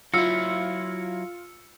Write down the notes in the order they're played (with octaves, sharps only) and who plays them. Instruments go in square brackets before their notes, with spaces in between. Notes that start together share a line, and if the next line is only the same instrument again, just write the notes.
[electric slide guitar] F#3 E4 [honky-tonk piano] F4 [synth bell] E6 C#7